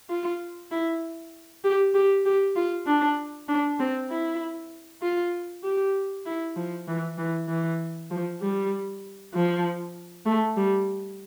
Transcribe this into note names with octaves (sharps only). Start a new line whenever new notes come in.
F4
E4
G4
G4
G4
F4
D4
D4
C4
E4
F4
G4
E4
F3
E3
E3
E3
F3
G3
F3
A3
G3